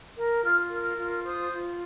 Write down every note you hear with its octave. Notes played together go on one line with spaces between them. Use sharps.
A#4
F4 F6
A#4
F6
F4
C5 D#6
F4